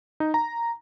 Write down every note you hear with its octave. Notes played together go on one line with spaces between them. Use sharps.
D#4
A#5